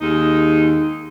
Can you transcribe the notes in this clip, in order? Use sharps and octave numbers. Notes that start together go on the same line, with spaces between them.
D#2 G#3 D#4